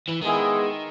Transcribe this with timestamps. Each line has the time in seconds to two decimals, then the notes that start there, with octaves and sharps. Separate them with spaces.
0.09 E3
0.22 D#3 G#3 B3 E4 G#4